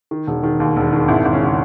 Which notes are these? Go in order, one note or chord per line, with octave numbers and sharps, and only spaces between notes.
D#3
E1
D#3
D#2
E1
D#3
G#1 E4
G#1
C#4
C#3